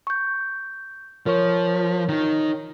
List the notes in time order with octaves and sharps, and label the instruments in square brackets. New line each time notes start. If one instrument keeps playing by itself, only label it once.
[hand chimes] C#6 G6
[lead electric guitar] F3 [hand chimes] A#4 C#5 C#6
[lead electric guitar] D#3 D#4